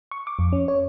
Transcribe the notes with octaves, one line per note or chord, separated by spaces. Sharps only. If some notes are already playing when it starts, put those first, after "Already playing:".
C#6
D6
F2
C#4
C#5